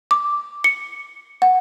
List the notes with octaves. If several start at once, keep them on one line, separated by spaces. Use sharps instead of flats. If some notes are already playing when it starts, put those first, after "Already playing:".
D6
C#7
F#5